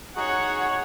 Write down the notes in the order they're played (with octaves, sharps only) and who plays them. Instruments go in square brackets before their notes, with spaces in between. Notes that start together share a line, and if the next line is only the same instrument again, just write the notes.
[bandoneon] D#4 F#4 G#4 [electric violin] C#5 F#5